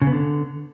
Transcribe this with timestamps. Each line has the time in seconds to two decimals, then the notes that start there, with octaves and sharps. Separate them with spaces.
0.02 C#3
0.07 B3
0.13 D3